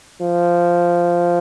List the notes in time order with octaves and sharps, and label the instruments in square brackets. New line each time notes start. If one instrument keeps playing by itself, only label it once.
[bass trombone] F3